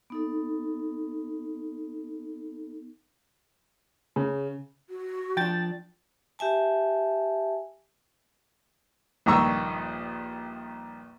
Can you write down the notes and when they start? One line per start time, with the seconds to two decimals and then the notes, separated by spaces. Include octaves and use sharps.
0.10 B3 D#4 A4
4.16 C#3
4.90 F#4
5.37 F3 D4 G5 A6
6.39 G4 E5 G#5 A5
9.26 A#1 G2 D#3 A#5 C#6 E6